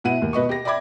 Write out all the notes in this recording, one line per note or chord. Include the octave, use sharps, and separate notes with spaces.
B2 E4 F#5 D#7
D#2
B2 B4 D#5 C#6
G4 A#6
D5 E5 G5 B5 D6 G#6